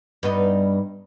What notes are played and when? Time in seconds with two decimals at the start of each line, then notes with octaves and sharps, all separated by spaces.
0.23 G2 B3 D#4